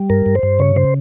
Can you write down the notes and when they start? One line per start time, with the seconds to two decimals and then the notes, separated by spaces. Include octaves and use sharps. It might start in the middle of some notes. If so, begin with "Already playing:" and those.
Already playing: G3
0.10 G2 A#4
0.26 G2
0.35 C5
0.43 G2
0.59 C#3 C#5
0.76 C#3 C5